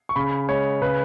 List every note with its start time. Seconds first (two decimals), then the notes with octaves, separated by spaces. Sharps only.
0.09 C#6
0.16 C#3 B5
0.48 G#3 C#5
0.81 C#3 B4